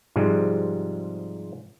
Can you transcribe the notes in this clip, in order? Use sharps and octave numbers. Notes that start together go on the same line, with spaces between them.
G#2 C3 F3 G3 G#3